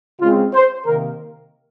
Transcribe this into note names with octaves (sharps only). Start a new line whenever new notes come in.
C#3 G#3 C4 F4
C5
C3 D#3 A#3 A#4